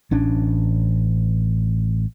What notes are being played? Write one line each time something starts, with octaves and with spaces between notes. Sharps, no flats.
A1 C#4 D4